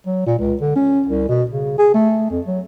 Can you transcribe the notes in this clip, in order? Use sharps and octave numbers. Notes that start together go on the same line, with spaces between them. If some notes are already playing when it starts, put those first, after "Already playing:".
F#3
A#2
C#2
D3
C#4
C2
B2
C#3
G#4
A3
F2
F#3